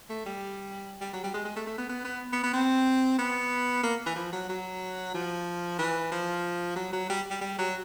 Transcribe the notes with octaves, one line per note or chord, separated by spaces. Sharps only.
A3
G3
G3
F#3
G3
G#3
G#3
A3
A3
B3
B3
B3
B3
B3
C4
B3
A#3
E3
F3
F#3
F#3
F3
E3
F3
F#3
F#3
G3
G3
G3
F#3